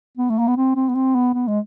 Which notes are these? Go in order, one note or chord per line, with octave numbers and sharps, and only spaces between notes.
B3
A3
A#3
B3
C4
C4
B3
C4
B3
B3
G#3